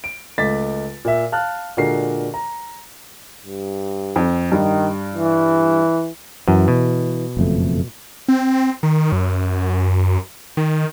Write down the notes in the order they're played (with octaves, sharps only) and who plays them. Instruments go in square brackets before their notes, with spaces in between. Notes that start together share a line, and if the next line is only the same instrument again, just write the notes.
[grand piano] D7
C#2 A3 D6 A6 B6
A#2 E5
F5 A5 F6 F#6
A#2 D3 G#3 F#4 A#4 C7
A#5
[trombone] G2
[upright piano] F2
[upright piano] G2 [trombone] D#3
[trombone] E3
[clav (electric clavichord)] F#2 [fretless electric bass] E3
[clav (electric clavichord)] B2
[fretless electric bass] F#1 F2 A3
[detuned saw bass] C4
D#3
F#2
D#3